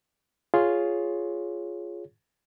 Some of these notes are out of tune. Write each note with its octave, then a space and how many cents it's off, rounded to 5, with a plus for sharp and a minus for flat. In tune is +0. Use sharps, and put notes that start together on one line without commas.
F4 +0 G#4 +0 C#5 +0